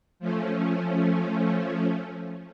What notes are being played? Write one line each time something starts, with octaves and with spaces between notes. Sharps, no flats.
F3 A3 C#4